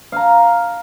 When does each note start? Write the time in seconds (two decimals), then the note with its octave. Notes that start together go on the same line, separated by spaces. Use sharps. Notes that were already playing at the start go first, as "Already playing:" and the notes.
0.12 F5 A#5